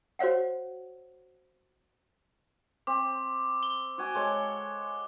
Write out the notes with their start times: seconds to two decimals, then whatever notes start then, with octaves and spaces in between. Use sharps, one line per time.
0.19 F#4 C5 C#5 F5 F#5
2.87 C4 D6
3.63 G7
3.98 F#4 G#5 D6
4.15 G#3 A4 C#5